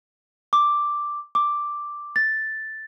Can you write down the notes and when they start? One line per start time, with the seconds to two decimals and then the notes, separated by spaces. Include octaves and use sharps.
0.53 D6
1.35 D6
2.16 A6